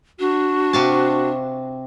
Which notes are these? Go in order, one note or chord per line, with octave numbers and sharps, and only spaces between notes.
D4 F#4
C3 F5 A5